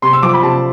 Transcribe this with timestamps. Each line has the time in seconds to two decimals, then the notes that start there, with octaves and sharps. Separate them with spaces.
0.02 C3 C6
0.13 E6
0.22 F3 D6
0.34 B5
0.43 C3 A5